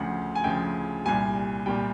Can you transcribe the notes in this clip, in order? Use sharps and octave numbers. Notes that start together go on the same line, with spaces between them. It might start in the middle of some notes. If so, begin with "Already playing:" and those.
Already playing: D2 C#3 F3 F#5
G#5
D2 C#3 F3 G5
C2 A#2 G3 G#5
A#2 G3 G5